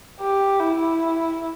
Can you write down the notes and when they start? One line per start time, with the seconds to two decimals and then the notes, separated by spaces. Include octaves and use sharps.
0.20 G4
0.59 E4